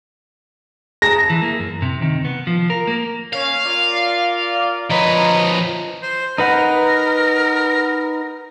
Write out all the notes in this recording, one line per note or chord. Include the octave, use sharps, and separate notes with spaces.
G#4 A5 A#5 A#6
E3
A#3
F#2
C3
D#3
B3
F3
A#4
A#3
A#3 C#4 F5
F4 A#4 D5
F3 B4 C#5 D#5 A#5
C5
D#4 A#4 B4 F#5